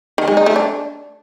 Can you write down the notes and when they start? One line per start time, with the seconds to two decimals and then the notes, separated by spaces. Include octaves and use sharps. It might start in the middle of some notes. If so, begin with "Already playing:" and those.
0.18 D#3
0.28 G#3
0.37 D#4
0.46 A3
0.56 D4